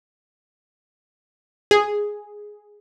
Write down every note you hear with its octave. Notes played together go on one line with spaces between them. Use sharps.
G#4